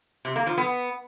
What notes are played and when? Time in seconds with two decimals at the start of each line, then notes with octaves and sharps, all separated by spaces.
0.25 C3
0.36 A#3
0.47 F3
0.58 B3